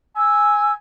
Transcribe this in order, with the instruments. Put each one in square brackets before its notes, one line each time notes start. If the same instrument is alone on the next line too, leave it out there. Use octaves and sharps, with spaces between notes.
[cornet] G#5 [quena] E6